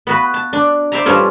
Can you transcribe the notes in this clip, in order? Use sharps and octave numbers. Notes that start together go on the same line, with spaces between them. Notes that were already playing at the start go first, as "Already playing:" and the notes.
B3 F#4 B4
A5
D4
C5 D5 E5 A5 A#5
G2 F3 C#4 A4